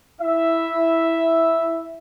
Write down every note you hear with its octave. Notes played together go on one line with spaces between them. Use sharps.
E4 E5